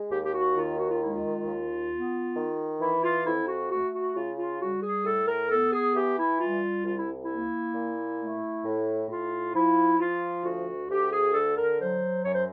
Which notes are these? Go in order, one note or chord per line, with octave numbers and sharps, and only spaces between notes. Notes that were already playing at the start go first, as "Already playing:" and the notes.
Already playing: G#3
D#2 G4
G4
F#4
D#3 F4
F#4
F4
G#3 E4
F4
D#2
B3
D#3
E3 E4
F4
F2 E4
F#4
A3 F#4
F#4
C#3 F4
F4
G3 F#4
G#4
A2 A4
A#4
B3 A4
G#4
E3 G4
E4
G3 F4
C2 F4
E4
A#3 E4
A#2
A3
A2
A2 F4
F3 E4
F3 F4
D2 F#4
D2 G4
G#4
D3 A4
A#4
F#3 C5
F#2 C#5
C5